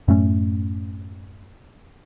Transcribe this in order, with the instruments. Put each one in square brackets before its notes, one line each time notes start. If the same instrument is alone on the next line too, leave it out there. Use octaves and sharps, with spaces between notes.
[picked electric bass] F#2 A2 A3 C#4